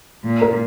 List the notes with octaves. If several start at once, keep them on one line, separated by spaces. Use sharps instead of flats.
A#2
A#4